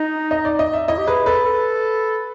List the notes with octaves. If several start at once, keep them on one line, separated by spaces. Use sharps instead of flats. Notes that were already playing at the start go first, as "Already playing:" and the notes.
Already playing: D#4 D#5
D#5
D5
D#5
E5
E4 D#5
G4
G#4 B4
A4 B4
A4